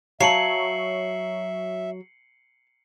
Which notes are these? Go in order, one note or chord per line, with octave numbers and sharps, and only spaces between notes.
F#3 C#5 E5 F5 A5 C7 C#7 F#7